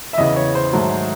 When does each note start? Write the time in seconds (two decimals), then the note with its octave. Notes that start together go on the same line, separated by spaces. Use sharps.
0.13 E5
0.18 E2 C#3 E3 D#5
0.36 C#5
0.55 C5
0.73 G#2 D#3 F#3 A3